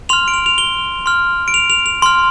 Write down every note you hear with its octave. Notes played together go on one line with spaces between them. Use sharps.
C6 F6 F7
D7
F7
F7
G7
C6 F6
D7
F7
F7
F7
C6 F6